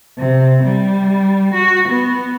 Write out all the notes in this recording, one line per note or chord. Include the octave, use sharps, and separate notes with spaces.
C3
G3
F#4
B3